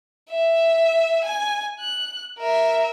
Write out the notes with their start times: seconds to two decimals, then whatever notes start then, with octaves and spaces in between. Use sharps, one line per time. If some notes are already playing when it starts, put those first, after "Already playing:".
0.30 E5
1.25 G#5
1.80 F#6
2.39 A#4 E5